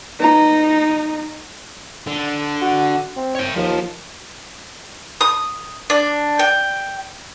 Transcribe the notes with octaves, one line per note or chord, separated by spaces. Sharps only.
D#4 B4 C#5 A#5
D3
F#4
C4
C#5 G5
D#2 F3
D#6
D4
G5